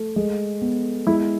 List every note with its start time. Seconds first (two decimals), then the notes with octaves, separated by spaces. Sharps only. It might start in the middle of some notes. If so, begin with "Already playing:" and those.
Already playing: A3
0.16 G#3
0.62 B3
1.07 G#3 E4